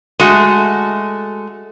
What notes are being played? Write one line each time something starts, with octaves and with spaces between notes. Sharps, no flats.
G#3 A3 F#4